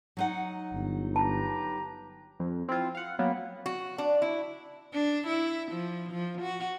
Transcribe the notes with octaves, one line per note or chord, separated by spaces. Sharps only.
F#3 D#4 F#5
G1
G4 B4 A5 A#5
F2
C4 E4 F4
F5 F#5
F#3 A#3 B3
F#4
D4
E4
D4
E4
F3
F3
F#4